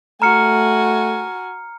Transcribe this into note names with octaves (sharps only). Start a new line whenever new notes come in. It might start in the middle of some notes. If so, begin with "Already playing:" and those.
A3 F#4 G#5 A#5 F6 C#7